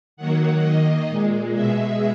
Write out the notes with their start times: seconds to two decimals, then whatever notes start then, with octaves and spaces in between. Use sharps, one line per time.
0.17 D#3 F#3 A#3 F#5
0.62 D#3 A#3 D#5
1.08 A#2 G#3
1.53 B2 G#3 E5